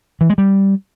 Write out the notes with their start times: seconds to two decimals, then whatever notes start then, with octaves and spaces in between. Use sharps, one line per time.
0.21 E3
0.29 G#3
0.38 G3